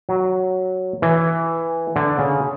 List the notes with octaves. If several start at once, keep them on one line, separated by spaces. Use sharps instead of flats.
F#3
E3
D3
C#3